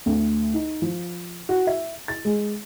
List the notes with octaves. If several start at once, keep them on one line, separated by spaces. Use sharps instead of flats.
D2
D#4
F3
F#4
E5
A6
G#3